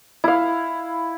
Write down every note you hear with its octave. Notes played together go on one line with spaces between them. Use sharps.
E4 F5